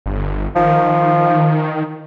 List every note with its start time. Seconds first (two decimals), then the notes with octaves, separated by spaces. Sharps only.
0.06 G1
0.55 D#3 F3